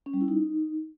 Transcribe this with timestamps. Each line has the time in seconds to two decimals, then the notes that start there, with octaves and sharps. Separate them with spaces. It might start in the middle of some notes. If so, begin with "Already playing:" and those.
0.06 C#4
0.13 G3
0.21 E4
0.28 D#4